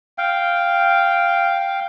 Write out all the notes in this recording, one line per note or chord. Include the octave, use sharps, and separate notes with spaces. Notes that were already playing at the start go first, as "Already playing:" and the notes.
F5 G5